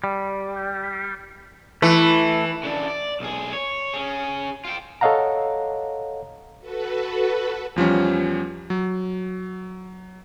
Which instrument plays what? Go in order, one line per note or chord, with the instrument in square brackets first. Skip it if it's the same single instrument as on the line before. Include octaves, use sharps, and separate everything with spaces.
[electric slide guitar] G3
[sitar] E3 [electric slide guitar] A3
[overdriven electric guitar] C#3 D4
D5
B1 G#4
C#5
C#4 G#4
F4 G5
[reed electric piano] A4 C#5 D#5 F5 F#5 A#5
[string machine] F#4 A4 B4
[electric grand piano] E2 F3 G3 C#4
F#3